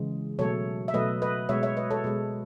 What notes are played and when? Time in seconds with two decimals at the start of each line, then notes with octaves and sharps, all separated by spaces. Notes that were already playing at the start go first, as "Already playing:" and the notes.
Already playing: C#3 E3 G#3
0.39 B2 F#3 A3 A4 C#5
0.88 E5
0.94 B2 F#3 A3 B4 D#5
1.22 B4 D#5
1.49 B2 G#3 C#5 E5
1.63 C#5 E5
1.77 B4 D#5
1.91 A4 C#5
2.04 B2 G#3